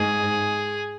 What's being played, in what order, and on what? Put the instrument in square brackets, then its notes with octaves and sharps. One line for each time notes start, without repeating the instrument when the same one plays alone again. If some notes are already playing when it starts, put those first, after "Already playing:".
Already playing: [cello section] G#2 [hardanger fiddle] G#4